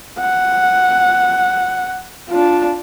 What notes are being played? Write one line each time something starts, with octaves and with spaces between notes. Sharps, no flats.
F#5
D4 F4